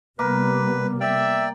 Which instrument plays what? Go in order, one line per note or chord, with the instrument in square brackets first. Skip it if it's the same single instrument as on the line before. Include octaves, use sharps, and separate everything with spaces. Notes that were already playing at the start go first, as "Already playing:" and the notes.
[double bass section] C3 G3 B3 [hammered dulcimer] A#3 [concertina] B4
[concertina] D5 G5 [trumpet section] E5